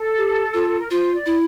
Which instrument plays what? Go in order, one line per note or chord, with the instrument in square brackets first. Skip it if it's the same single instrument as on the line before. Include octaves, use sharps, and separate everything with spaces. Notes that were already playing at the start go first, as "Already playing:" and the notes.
Already playing: [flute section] A4
[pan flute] G4
F4
[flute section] A#4
[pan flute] F4 [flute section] C5
[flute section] D5
[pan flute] E4